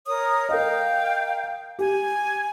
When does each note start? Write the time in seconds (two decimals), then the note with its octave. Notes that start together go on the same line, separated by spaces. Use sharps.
0.07 A#4 C#5 D#6
0.49 A#4 D#5 F5 G5
1.79 G4 G#5